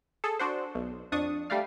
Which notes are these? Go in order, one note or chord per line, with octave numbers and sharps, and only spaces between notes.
G#4 A4
D4 F#4 C5
B1
F2 D4 C#6 D#6
G3 A3 D5 F5